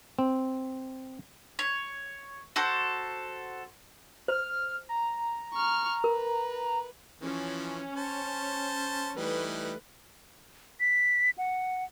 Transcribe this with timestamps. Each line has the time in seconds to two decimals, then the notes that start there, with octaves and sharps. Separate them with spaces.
0.19 C4
1.59 C#5
2.56 F#4 A4 C5
4.28 C5 F6
4.89 A#5
5.53 C#6 F6
6.04 A#4 B4
7.21 E3 F3 C#4
7.96 C5 A5
9.16 E3 G3 A3 D#4 B4
10.80 B6
11.38 F#5